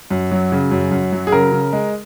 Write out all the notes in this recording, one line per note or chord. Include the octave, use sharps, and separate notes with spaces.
F#2
F#3
C#3
F#2
F#2
F#3
G#4
C#3 A#4
C#3
G#3